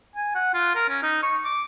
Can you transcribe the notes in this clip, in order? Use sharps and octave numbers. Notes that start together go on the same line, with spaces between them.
G#5
F#5
F4
A#4
C#4
D#4
C#6
D6